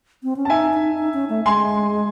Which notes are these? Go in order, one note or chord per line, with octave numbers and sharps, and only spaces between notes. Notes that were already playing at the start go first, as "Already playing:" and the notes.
C4
C#4
A5
D#4 E5 G#5
D#4
D#4
C#4
A3
G#3 G#5 C6